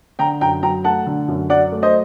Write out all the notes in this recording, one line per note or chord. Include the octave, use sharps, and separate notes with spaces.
D3 G5 A#5
F#2 G5 A#5
F#3 G5 A#5
A3 F#5 A5
D3
F#2
F#3 D5 F#5
A3
C5 D#5